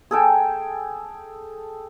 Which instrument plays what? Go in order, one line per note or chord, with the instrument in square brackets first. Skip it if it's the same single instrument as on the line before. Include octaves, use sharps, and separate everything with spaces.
[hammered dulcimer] G#4 A4 G5